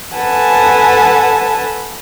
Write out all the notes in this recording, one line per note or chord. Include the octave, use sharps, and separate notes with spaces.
A4 B4 F#5 G#5 A5